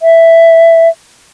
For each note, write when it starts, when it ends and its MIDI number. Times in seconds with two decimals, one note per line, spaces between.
0.01 0.89 76